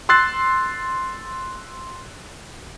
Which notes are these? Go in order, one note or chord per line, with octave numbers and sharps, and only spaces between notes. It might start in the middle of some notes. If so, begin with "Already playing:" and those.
C6 E6 F#6 A6 C7